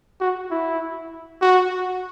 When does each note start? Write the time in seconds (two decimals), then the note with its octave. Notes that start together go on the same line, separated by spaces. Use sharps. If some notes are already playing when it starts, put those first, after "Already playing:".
0.20 F#4
0.51 E4
1.42 F#4